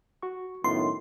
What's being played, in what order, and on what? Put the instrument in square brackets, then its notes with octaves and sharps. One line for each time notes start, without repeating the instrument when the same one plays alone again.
[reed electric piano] F#4 C#6
[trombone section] F#2 A2 D#3 [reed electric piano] B3 D#4 F4 [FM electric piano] C6